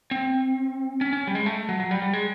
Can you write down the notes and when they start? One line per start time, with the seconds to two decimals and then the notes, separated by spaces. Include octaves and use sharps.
0.11 C4
1.01 C#4
1.13 C#4
1.27 G3
1.35 G#3
1.46 A3
1.69 F#3
1.80 F#3
1.91 G3
2.02 G3
2.13 G#3